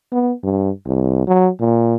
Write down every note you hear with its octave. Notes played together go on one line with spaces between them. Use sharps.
B3
G2
C2
F#3
A#2